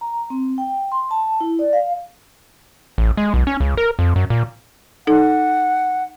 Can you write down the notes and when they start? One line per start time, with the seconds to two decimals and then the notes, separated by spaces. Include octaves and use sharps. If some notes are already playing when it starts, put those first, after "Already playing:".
0.01 A#5
0.30 C4
0.58 G5
0.92 C6
1.11 A5
1.41 E4
1.59 D5
1.73 F5
2.98 A1
3.17 G#3
3.34 B1
3.47 C#4
3.60 C#2
3.77 A#4
3.99 F2
4.16 F#2
4.30 A#2
5.07 D#4 A4 F#5